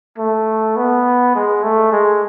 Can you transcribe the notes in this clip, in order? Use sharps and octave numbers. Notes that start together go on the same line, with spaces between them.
A3
B3
G#3
A3
G#3